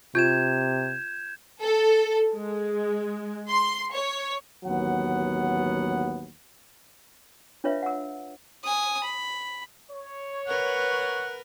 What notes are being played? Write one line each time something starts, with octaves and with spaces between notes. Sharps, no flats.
C3 F4 G6 G#6 E7
A4
G#3
C6
C#5
A1 D#2 F#3 B3 F#5
D4 F4 B4 C#5 E5 F5
F#5 E6
G#5 D#6
B5
C#5
A#4 B4 F#5